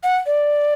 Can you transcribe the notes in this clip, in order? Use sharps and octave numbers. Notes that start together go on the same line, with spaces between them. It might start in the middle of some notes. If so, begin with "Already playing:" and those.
F#5
D5